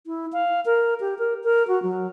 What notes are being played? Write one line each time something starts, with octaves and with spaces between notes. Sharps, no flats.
E4
F5
A#4
G4
A#4
A#4
F#4
F#3